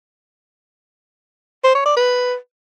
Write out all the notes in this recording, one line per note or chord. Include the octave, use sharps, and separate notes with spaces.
C5
C#5
D5
B4